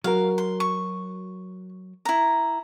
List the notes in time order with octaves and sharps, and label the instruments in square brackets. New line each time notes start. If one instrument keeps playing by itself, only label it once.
[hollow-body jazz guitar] F#3 F#4 A#4 [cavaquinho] F5
[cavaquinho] C6
C#6
E4 A#5